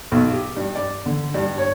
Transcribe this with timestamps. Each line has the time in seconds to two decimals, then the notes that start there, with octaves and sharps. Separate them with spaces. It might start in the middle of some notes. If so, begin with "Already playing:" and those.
0.12 B1
0.33 G4
0.57 G2
0.75 D5
1.06 D3
1.34 G2
1.58 C#5